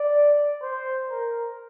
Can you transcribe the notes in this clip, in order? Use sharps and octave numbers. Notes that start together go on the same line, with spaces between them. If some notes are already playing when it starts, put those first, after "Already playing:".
Already playing: D5
C5
A#4